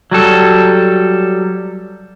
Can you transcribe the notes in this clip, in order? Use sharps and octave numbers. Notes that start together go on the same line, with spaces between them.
F#3 G3 A4